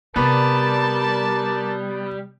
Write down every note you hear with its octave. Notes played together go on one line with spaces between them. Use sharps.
C3 G3 B3 A#4 D5 A5